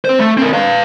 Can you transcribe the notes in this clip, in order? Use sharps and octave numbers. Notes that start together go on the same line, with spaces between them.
C4 C5
A3
C4 A#4
B4 F5